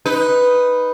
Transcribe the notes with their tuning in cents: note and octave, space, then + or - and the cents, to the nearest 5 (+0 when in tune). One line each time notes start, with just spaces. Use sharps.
D#4 +0 B4 +0